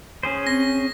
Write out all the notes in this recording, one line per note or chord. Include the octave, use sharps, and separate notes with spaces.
C#4 G#4 C5
C4 A#6